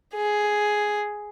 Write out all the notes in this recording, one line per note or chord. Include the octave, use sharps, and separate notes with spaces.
G#4